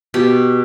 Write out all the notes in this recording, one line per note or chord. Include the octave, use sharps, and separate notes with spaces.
B2 G4